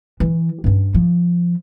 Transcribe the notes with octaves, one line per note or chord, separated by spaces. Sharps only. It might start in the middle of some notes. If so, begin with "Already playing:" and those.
E3
G2 C#4
F3